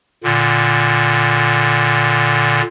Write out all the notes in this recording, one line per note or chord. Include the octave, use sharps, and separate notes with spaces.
A#2 D3